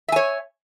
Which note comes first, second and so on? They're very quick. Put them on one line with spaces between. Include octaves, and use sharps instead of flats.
E5 G#5 C#5